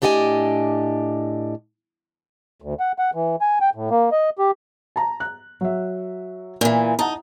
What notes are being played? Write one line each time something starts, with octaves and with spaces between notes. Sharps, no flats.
A2 D4 G4 D#5 G5 G#5
D2
F#5
F#5
E3
G#5
G5
A2
A#3
D#5
G4
A5 A#5
F#6
F#3 E5
A#2 E3
D#4 F#5 A5 A#5